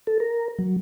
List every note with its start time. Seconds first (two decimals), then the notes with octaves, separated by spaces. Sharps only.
0.07 A4
0.20 A#4
0.59 F#3